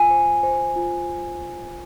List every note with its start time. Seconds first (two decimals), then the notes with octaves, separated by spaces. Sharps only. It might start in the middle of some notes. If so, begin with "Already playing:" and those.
Already playing: F4 C5 G#5
0.11 C5
0.43 C5
0.76 F4